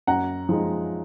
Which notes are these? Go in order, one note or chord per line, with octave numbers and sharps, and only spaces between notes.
F#2 F#5 A#5
F3 G#3 D#4